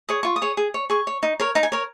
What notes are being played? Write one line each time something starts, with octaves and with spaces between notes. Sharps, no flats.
G#4 C#5 D#6
F4 C#6
D#6
G#4 C#5
G#4
C#5
G#4 C#6
C#5
D#4
A#4 C#5
D#4 A#5
G#5
A#4 C#5